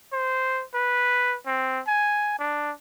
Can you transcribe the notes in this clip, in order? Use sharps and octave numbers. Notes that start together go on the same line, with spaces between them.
C5
B4
C4
G#5
D4